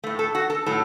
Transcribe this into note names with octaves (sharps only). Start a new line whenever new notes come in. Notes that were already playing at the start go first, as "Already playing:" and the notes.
A2 A3
A4
F#4
A4
A2 F#3 A4